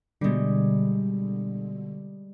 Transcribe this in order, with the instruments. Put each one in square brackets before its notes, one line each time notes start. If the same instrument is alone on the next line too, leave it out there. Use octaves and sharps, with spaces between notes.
[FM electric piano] B2 D3 [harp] G3 G#3